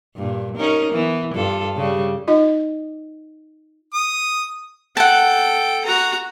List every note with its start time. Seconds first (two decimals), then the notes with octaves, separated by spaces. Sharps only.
0.16 G2 A#2
0.56 C#4 D#4 A#4
0.92 E3 B3
1.35 G2 F4 A4
1.76 C#3 G3
2.28 D#4 F4 D#5
3.94 D#6
4.97 A4 F#5 G5 A5
5.84 F#4 A#5